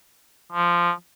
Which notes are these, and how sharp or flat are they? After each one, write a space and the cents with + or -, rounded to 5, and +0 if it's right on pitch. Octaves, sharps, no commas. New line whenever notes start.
F3 -10